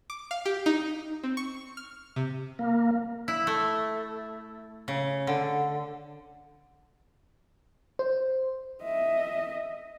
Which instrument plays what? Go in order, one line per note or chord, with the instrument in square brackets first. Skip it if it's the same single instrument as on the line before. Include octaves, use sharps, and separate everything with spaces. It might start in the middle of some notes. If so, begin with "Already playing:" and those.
[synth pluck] D6
F5
G4
D#4
C4
C#6
F6
C3
[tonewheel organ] A#3
[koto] E4
A3
C#3
D3
[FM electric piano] C5
[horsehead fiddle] D#5 E5